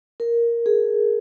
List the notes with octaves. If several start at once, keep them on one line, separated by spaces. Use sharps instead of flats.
A#4
G#4